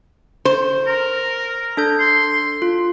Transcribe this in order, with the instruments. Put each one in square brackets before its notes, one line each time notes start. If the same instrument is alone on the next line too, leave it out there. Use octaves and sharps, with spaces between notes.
[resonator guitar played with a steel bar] C5
[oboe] A#4
[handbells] D4 A4 G6
[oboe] C6
[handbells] F4